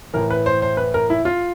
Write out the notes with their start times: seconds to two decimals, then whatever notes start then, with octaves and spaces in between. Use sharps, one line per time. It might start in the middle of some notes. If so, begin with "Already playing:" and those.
0.14 A2 E3 A#4
0.30 B4
0.46 C5
0.62 C5
0.77 B4
0.94 A#4
1.10 E4
1.25 F4